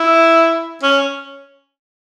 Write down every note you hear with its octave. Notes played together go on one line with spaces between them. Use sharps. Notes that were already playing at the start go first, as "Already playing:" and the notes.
Already playing: E4
C#4